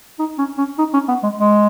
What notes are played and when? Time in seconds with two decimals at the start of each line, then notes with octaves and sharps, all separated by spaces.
0.19 D#4
0.38 C#4
0.58 C#4
0.78 D#4
0.93 C#4
1.08 B3
1.23 G#3
1.38 G#3